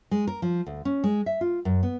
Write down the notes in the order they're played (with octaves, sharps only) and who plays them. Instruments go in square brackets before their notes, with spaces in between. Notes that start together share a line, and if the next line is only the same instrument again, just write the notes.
[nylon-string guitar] G#3
A#4
F3
D2
C#4
G#3
E5
F4
F#2
B3